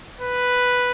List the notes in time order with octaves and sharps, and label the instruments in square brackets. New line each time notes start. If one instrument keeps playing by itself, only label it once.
[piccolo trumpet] B4